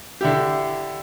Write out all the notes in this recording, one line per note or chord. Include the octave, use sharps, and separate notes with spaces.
D3 E4 G4